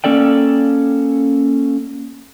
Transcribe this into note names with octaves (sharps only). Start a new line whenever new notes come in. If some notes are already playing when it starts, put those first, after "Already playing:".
A#3 C#4 A4 D5 G5